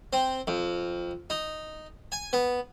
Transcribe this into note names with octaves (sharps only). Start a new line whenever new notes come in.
C4
F2
D#4
G#5
B3